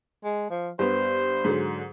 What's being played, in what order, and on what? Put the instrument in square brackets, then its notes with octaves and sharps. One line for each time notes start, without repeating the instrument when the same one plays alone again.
[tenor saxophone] G#3
F3
[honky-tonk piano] G2 B3 [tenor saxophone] C5
[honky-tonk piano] G#2 D3 F#3